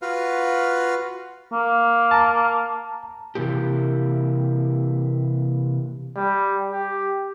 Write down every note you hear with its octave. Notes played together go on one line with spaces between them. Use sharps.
F4 F#4 B4 F5
A#3
A5 A#5
C3 E3 A#3 G4
G3
G4